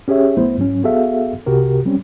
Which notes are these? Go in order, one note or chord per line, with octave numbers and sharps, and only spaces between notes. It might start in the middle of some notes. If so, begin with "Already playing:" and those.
C#4 G4 G#4 C#5 E5
C2 F#3 A3 B3 E4 C5
G#2 F#3 C#4
B3 F#4 G#4 A4 E5 F5
C2 C3 F#4 G4 A#4
F#3 G3 C4 C#4